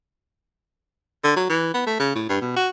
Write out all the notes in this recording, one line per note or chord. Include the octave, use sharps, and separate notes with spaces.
D3
F#3
E3
B3
A3
C#3
A2
G2
B2
F#4